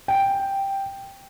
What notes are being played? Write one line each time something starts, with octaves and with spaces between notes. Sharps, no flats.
G5